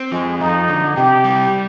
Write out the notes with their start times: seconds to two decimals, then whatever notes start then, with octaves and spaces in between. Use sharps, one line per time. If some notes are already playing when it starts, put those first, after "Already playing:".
Already playing: C4
0.12 F3 G#3
0.40 F2 D#4
0.68 D3
0.97 C3 G4
1.24 G3